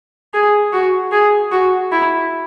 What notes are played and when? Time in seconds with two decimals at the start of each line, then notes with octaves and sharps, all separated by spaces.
0.34 G#4
0.73 F#4
1.12 G#4
1.52 F#4
1.92 E4